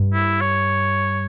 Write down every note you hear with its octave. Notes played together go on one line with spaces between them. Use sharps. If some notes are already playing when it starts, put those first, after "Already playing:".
Already playing: G2
E4
C#5